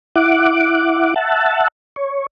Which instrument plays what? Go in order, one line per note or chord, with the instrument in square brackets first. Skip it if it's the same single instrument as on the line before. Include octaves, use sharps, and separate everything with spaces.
[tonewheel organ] E4 F#5 D6
E5 F#5 A5
C#5